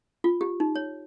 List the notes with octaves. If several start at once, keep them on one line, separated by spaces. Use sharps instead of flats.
F4
G4
D#4
C#5